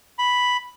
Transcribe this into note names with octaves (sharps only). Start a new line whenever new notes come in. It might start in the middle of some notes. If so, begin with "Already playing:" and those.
B5